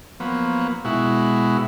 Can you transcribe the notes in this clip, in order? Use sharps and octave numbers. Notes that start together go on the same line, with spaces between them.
F3 F#3 A#3 B3
B2 G#3 E4 F#4